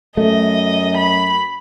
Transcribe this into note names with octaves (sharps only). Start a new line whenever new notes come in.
F#2 A3 D#5
B5